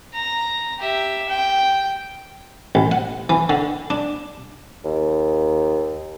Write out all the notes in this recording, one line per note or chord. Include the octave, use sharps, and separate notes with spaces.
A#5
G4 E5
G5
A1
F#5
E3
D3
D4
D#2